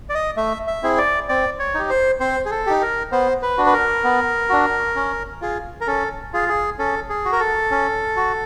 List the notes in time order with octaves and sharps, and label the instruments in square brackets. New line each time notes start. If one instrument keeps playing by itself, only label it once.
[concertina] D5
D#5
A3 E5
E5
C4 E4 G#4
D5
C4 D5
C#5
D#4 G4
C5
C4 C5
G#4
A4
D#4 G4
A#4
B3 C5
B4
D4 F#4
B4
A#4
B3
D4 F#4
C#4
F4 G#4
A#4
C#4 A4
F4 G#4
G#4
C#4 A4
G#4
F#4
A#4
A4
C#4
F#4